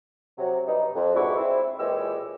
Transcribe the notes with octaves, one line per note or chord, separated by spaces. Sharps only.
C3 F#3
G2 B2 G3 D#4
F2
G#2 B2 D4 E4 F#5 C#6
C4 E4
A#2 E3 G#3 G4 C#5 E6